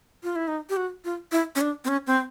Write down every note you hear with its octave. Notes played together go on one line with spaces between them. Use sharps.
F4
E4
D#4
G4
F#4
F4
E4
C#4
D4
C4
C#4
C4